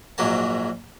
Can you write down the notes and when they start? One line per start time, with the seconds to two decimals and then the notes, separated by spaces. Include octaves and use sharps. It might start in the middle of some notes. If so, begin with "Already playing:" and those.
0.18 A#1 G#2 F#3 A#3 A5